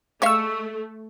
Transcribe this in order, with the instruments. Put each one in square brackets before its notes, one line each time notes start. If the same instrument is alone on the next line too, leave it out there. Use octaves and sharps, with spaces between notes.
[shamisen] G#3 E5 F5 [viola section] A3 [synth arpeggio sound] C#6 E6